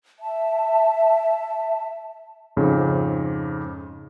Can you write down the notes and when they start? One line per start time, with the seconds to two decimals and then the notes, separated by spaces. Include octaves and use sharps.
0.20 E5 A5
2.57 F2 G#2 C#3